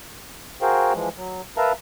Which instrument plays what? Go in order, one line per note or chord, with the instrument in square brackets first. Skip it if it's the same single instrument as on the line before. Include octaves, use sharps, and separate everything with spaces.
[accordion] F#4 G#4 A#4 C5 F5 G5
E3 F3 G#3
F#3
A#4 B4 E5 F5 A5 A#5